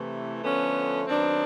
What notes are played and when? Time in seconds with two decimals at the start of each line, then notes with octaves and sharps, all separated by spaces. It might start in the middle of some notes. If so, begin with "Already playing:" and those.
Already playing: C3 E3 A3
0.43 D3 F3 A3 B3 C#4
1.07 D#3 F#3 B3 C4 D4